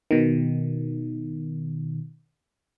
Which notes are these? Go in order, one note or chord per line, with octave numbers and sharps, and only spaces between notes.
B2 D#3